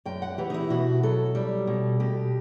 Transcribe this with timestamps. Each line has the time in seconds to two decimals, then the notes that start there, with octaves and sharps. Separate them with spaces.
0.05 F#2 G5
0.22 F#5
0.38 E3 G4
0.50 D#4
0.54 E4
0.70 B2 F#4
1.03 F#3 A4
1.35 G3
1.67 B2
2.00 B2 G4